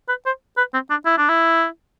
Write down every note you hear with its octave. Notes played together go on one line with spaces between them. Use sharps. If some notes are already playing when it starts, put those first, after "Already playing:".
B4
C5
B4
C4
D4
E4
D4
E4